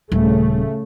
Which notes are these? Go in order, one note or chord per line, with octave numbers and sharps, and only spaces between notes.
D#1 C#3 A3